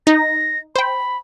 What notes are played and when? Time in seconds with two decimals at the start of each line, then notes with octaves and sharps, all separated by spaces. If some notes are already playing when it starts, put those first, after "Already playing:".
0.07 D#4 A#6
0.76 C5 G5 B5